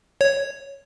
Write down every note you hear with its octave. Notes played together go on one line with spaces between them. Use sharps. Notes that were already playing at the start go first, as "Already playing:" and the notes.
C#5